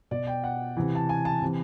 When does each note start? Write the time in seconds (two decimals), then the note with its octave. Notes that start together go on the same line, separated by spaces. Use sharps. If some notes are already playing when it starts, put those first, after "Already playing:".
0.11 B2 D5
0.27 G5
0.44 F#5
0.77 C3 E3
0.95 A5
1.09 G#5
1.25 A5
1.42 C3 E3